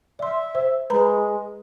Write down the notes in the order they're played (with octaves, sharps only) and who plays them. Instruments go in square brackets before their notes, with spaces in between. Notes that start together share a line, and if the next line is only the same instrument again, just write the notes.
[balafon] D5 C6 [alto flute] E5
[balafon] C5
[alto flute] G#3 [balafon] B4 A#5 B5